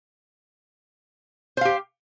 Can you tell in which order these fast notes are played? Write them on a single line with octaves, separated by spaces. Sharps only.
C5 F5 G4